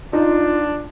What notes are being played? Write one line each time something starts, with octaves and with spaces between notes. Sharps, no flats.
D4 D#4 F4